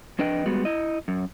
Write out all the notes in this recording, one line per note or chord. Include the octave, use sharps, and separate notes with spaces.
F2 D4 B4 D#5 G5
G3 G#3 B3 F#4
E4 D#5
F#2